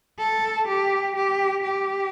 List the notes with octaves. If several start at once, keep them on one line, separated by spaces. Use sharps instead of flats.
A4
G4
G4
G4